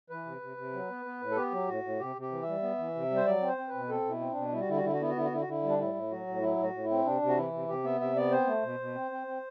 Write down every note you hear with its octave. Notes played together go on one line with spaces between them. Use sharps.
E3 B4
C3
C3
C3
F#3
B3
B3
A2
A4
B3 G4
F#3
A2 F#4
A2
C3 G4
C3
G4
E3
E5
G3
B3
E3
C3
G3
C5
F#3 D5
C4
C5
C4
B4
B2
C4 A4
B2 E4
C4
D4
B2
G3 E4
F#4
D3 E4
F#4
D3 E4
F#4
B3 E4
F#4
D3 E4
F#4
D3 E4
F#4
D3 E4
G3
D4
A2 E4
A2
F#3 F#4
A2
F#3 E4
A2
F#4
A2
E4
C4
C3 D4
C3
F#4
E3 E4
C3
C3 G4
B3 E5
C3 E5
B3 D5
C4 C5
A3
B2
B2
C4
C4
C4